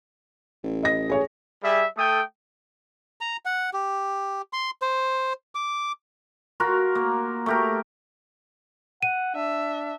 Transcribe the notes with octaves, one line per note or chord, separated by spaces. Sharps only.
A1
D#5 A#6
G#4 C#5 G#5
G3 G#4 E5
A3 A4 G5 D#6
A#5
F#5
G4
C6
C5
D6
F4 F#4 A#4
A#3
A3 G4 A#4
F#5 D#7
D4 E5